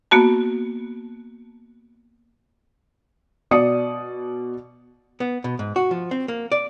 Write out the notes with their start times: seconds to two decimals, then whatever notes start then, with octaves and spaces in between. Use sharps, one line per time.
0.11 A#3 B3 F#4 A5
3.51 B2 D5 D#6 C#7
5.20 B3
5.44 B2
5.59 G#2
5.76 F#4
5.91 F3
6.11 C4
6.28 A#3
6.52 D5